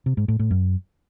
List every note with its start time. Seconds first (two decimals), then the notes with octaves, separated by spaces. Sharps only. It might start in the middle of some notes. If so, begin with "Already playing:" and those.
0.06 C3
0.17 G#2
0.28 A2
0.39 A2
0.51 F#2